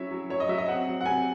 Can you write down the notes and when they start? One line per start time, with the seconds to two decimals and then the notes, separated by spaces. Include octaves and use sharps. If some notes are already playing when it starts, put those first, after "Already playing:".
Already playing: F#3 C#4 E4 C#5 E5
0.11 F#3
0.30 F#3 C#5
0.40 D#5
0.48 F#3 E5
0.58 D#5
0.68 C4 F#5
0.87 F#3
1.01 F#5
1.06 C3 G#5